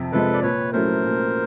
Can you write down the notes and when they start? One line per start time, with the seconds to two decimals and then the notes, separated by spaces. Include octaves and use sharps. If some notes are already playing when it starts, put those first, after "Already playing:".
Already playing: F2 C3 F3
0.12 C3 F3 G#3 A4 B4
0.33 D5
0.43 A#2 B4 C#5
0.73 F#3 A3 C#4 E4 A#4 C5
1.04 A#2